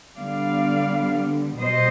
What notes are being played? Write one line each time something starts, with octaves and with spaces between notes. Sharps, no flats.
D3 G3 B3 D5 F5
B2 G3 C5 D#5